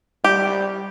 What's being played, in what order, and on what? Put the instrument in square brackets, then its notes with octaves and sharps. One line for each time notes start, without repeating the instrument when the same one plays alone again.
[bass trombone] G3 [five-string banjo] G4